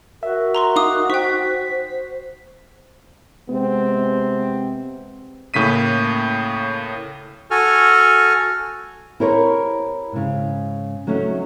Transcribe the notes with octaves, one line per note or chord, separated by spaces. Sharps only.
F#4 A#4 E5
A#5 C6 C#6
D#4 F5 D6 D#6
C5 G5 C#6 B6
C3 G#3 B3 C4
A2 C#3 A#3 B6 D#7
F#4 A4 G#5 F6
E4 G4 G#4 A#4 C5 C#5
G#2 C#3
F#3 A3 C#4 D#4